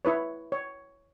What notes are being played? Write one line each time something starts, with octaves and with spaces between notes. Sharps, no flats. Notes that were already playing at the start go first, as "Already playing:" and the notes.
E4 B4 C#5
C#5